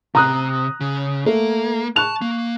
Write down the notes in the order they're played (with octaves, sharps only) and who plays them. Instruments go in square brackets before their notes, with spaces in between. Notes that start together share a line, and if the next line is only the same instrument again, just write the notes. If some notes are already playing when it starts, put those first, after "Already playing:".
[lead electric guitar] C3 [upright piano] A#5 D#6 F#6
[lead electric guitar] C#3
[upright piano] A3 [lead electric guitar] A#3
[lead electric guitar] A5 [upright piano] C#6 F#6 F7
[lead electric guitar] A#3